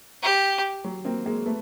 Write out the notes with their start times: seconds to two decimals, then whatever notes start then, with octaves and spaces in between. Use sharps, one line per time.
0.23 G4
0.85 F#3
1.05 A#3 C4
1.26 G#3 A#3
1.46 A3 B3